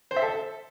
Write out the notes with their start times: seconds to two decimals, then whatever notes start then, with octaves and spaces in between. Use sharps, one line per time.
0.11 C5
0.16 E5
0.22 A4